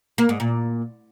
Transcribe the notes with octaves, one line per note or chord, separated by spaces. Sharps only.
A#3
G#2
A#2